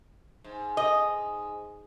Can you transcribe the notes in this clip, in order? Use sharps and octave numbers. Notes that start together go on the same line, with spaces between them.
G#2
D#5